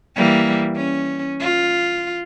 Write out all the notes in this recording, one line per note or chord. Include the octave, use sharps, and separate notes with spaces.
E3 G3 A#3
C#4
F4